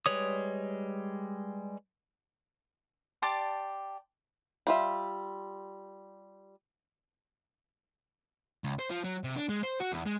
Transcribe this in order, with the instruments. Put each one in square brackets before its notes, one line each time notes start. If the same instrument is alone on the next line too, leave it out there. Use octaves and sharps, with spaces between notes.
[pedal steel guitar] G3 G#3 B4 C#5 D#6
[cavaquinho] G4 D5 A5 C6
[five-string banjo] G3 F4 E5
[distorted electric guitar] C#2
C5
F3
F#3
C3
D4
G#3
C5
F#4
E2
G#3